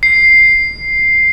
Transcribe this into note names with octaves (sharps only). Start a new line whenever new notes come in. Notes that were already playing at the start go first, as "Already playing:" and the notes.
C7